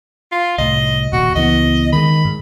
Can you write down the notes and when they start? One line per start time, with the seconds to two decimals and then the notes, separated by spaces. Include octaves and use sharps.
0.32 F4
0.58 C2 A2 D#5
1.13 D#1 A#2 F#4
1.35 C#2 E3 B3 D#5
1.93 D#3 G#3 B5
2.25 G#2